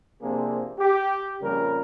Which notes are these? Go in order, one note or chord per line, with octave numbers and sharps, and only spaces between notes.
C3 F3 A#3 C4 D4 G#4
G4
F2 A#2 C#3 G3 A#4